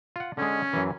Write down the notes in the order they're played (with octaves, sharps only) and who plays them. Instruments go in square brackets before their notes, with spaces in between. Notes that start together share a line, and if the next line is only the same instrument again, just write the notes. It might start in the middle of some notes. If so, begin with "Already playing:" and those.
[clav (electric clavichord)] F4 F#5
[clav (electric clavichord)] D3 G#3 [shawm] C#4
[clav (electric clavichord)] F#2 E3